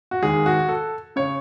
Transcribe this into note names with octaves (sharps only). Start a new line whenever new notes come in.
F#4
D#2 D#3 G#3 G#4
F#4
A4
C#3 C#5